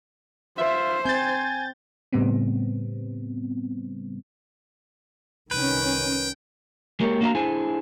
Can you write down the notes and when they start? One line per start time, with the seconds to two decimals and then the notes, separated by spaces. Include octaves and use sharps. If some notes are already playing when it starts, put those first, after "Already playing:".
0.58 F4 C5 E5
1.05 C4 G#5 G6 A6
2.13 A2 C#3 G3 B3 C4
5.51 C2 D#3 C#4 B4 G5
7.00 G#3 A#3 G4 A#4 C5 C#5
7.21 A#3 D4 F#4 D5 F5 A#5
7.35 D4 E4 G#4 A4 C5 G#5